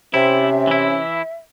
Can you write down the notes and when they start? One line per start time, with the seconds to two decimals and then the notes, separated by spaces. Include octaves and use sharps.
0.14 C3 C#4 E4 E5
0.67 E3 E4